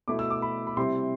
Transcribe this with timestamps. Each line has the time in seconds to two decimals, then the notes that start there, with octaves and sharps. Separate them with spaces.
0.08 B2 A3 E4 D6
0.19 E6
0.30 D6
0.42 B5
0.67 B5
0.77 C3 G3 C4 E4 C6